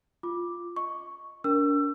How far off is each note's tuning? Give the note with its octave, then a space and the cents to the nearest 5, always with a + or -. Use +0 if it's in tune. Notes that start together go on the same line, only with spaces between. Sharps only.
F4 +0 D6 +0
D#5 +0 C#6 +0
D4 -40 A#4 +0 E6 +30